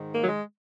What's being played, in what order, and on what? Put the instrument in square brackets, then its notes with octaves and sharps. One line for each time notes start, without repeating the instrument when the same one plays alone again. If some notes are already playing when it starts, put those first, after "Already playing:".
Already playing: [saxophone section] G#2 D#3
A#3
F#3
G#3